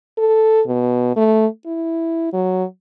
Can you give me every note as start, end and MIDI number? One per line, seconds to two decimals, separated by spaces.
0.18 0.61 69
0.67 1.12 47
1.16 1.46 57
1.66 2.30 64
2.33 2.64 54